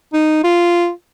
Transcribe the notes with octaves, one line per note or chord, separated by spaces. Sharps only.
D#4
F4